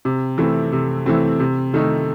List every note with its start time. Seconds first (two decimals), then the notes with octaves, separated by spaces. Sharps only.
0.05 C3
0.38 E3 A3 C4
0.72 C3
1.06 E3 A3 C4
1.40 C3
1.73 D#3 A3 D#4